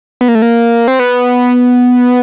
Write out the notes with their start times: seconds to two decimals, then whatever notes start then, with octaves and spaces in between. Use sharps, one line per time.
0.21 B3
0.28 A#3
0.35 A3
0.42 A#3
0.88 C4
0.99 B3